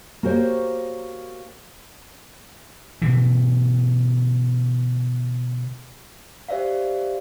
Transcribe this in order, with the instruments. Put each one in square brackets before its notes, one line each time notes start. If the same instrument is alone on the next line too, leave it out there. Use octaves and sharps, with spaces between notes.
[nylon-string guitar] A#3 F#4 G4 C5 C#5
[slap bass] B2 D3 E3
[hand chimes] G4 C5 D5 E5 F5